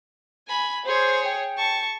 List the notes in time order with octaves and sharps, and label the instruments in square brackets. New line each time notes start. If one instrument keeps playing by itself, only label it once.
[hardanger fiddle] G#5 B5
[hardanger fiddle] G#4 C#5 [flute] C5
[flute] G5
[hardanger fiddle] A5 C#6